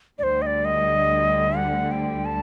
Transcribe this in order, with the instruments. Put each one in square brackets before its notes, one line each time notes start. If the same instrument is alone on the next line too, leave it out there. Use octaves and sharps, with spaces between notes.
[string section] D2 D3 G3 [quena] C5 D5
[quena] D#5
D5
D#5
F#5
G5
A5